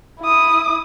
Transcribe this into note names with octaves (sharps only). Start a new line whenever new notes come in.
E4 D#6